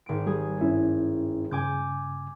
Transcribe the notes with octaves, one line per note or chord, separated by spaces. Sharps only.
G#1 D7
G3 G#4
G2 C#4 E4
G2 C#3 G#5 D6 G6